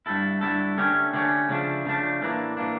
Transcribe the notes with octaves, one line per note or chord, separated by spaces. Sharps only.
G2 D3 A3 E4 A4
G2 D3 A3 E4 A4
D3 A3 C#4 G4 C#5
D3 A3 C#4 G4 C#5
C#3 F3 A3 D4
C#3 F3 A3 D4
A2 E3 A#3 D4
A2 E3 A#3 D4